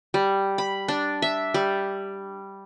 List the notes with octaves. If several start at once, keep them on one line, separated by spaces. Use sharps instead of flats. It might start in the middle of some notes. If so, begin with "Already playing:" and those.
G3
B5
D4
E5
G3